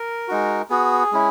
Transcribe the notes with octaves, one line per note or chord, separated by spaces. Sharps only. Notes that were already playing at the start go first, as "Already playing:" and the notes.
Already playing: A#4
G#3 D#4 F#4
B3 F#4 G#4
G#3 C#4 E4